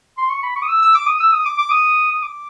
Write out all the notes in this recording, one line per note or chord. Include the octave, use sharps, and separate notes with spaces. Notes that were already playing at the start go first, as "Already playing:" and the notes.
C6
C#6
B5
C#6
D#6
E6
E6
D6
D#6
E6
D#6
D6
D6
D#6
D#6
D6